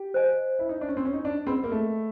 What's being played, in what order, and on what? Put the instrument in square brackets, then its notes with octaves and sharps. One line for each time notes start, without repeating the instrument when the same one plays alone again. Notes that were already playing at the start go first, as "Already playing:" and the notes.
Already playing: [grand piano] G4
[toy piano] C5 D#5 G#5
[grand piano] E4
D#4
D4
C#4
C4
C#4
D#4
D4
[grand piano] C4 [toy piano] G#4 B4 D#5 F#5 B5
[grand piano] A#3
A3